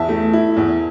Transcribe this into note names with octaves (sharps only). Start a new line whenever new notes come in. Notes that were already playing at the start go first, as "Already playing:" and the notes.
Already playing: E2 E5 A5
A3
E4
E2